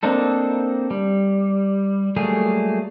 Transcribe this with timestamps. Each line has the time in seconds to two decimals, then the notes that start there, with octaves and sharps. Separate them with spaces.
0.03 A#3 C4 D4 D#4 A4
0.91 G3
2.16 F#3 G3 A3 A#3 G#4